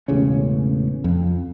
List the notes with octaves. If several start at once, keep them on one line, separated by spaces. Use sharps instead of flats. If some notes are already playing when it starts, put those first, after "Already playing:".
E1 A1 C#3 C#4
F2